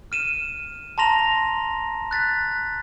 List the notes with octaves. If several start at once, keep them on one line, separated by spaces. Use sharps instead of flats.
F6 D#7 E7
A5 A#5 C6 A#6 F7
F#6 A6 B6